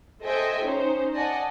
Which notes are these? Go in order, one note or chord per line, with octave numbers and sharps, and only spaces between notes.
A4 C5 D#5 E5 G5 G#5
C#4 D#4 C5
D5 D#5 F#5 G#5 A5